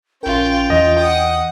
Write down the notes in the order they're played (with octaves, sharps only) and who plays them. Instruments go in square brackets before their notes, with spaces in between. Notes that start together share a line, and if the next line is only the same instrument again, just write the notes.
[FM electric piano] A#1 A#4 [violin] C#4 F4 [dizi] G5
[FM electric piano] E2 E3 [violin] F4 [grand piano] D#5
[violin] F#5 D#6